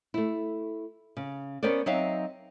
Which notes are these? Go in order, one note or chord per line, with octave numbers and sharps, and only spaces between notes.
A3 E4
C#3
B3 C#4 A#4 C5 D5
F#3 C4 D#4 E5 F5